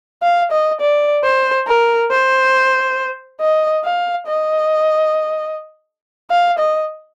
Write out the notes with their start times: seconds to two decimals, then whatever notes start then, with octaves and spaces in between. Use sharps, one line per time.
0.22 F5
0.52 D#5
0.81 D5
1.24 C5
1.67 A#4
2.11 C5
3.41 D#5
3.85 F5
4.27 D#5
6.31 F5
6.59 D#5